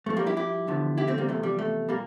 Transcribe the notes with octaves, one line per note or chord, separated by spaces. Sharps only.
G2 F3 A3
G3 A#3
E4 G4
E4 G4
E2 D3 F3
E4 G4
A3 C4
G3 A#3
E2 C3 F3 A3
G3
A3
A#2 G3 A#3